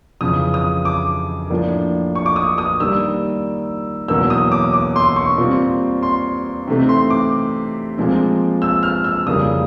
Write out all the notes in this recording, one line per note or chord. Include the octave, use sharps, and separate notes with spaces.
F2 C#3 E3 D#6
D#6
D6
A2 F3 A#3 D4
C#6
D6
D#6
D#6
D#3 G3 A#3 E6
E2 B2 F#3 A#3 C#4 E6
D#6
D6
D6
C6
C#6
A#2 G3 C4
C6
C3 E3 A3 C4 D#4
C6
D6
A#2 F3 G#3 C4
E6
F6
E6
F2 C#3 E3 G3 A#3 D#6